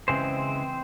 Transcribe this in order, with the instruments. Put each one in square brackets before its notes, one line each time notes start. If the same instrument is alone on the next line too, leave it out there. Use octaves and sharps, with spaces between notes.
[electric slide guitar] C#3 E3 G#3 C4 C5